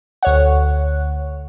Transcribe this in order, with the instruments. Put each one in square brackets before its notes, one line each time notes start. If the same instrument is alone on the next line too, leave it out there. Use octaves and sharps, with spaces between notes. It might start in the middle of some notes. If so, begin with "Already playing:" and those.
[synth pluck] D2 C#5 F#5